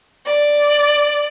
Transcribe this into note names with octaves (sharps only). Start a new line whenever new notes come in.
D5